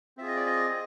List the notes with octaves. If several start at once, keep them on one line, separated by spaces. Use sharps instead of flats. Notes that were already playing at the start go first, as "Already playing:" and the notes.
C4 F4 G#4 E5
D#5
D5
D#5
G#4